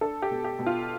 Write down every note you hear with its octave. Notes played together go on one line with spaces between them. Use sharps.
D4 A4
G4
B2
G4
B2
F4